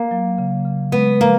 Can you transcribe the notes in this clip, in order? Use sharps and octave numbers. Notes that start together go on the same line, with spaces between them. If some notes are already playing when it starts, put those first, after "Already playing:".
Already playing: A#3
F#3
C#3
C#3
G#3 B3
F3 A#3